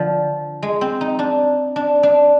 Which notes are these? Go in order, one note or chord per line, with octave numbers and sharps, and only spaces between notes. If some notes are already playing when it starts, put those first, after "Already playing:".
Already playing: D3 F3
G#3
C4
D#4
D4
D4
D4